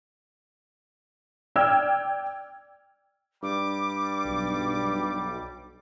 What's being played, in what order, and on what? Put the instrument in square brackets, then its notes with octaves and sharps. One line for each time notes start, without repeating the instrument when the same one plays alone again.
[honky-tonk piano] D5 G5 E6 F6 G#6
[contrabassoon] G2 [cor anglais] G3 [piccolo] D6
[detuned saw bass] B1